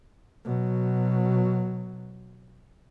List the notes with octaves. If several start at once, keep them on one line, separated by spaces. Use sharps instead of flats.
B2 F#3